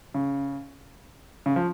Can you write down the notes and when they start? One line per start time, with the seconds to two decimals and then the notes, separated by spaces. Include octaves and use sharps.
0.14 C#3
1.46 C#3
1.56 F3